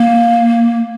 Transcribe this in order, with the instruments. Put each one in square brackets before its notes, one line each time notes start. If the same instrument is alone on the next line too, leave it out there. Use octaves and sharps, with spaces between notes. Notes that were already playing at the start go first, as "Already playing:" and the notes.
Already playing: [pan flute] A#3